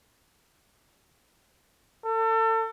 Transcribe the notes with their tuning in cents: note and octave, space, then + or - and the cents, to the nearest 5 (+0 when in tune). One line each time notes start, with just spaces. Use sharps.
A4 +35